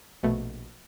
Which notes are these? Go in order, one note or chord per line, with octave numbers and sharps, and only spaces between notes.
A#1 B2 A3